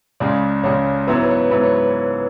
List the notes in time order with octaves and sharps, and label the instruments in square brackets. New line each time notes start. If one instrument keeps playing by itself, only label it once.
[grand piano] C#2 C#3 G#3 [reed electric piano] D5
[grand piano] C#2 C#3 G#3 [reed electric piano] C#5
[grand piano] G#2 F#3 B3 E4 [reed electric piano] B4
[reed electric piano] C#5
B4
C#5
B4
[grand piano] G#2 F#3 B3 E4 [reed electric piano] B4
[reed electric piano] C#5
B4